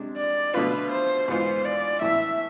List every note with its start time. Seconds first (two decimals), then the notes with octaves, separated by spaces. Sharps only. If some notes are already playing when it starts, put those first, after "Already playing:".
Already playing: C3 G#3 D4
0.17 D5
0.54 B2 A3 D4 F4 B4
0.91 C5
1.28 G#2 E3 B3 F4 C5
1.65 D5
2.02 A2 E3 B3 E4 E5